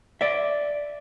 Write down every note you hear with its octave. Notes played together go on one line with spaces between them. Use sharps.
D5 E5